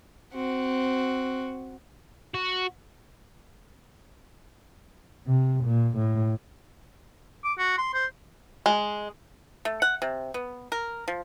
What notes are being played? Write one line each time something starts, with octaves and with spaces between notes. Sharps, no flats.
C4 F#4
F#4
C3
A#2
A2
D6
F#4
C6
C5
G#3
A3
F#5
C3
B3
A#4
F3